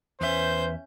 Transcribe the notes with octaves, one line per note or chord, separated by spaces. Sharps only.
E2 C#4 B4 C5 E5 G6